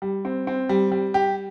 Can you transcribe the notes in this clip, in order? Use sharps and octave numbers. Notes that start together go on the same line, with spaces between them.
G3
C4
C4
G3
G3
G4